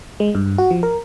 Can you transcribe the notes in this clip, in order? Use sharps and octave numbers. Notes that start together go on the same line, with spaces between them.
G#3
G2
F#4
F3
A#4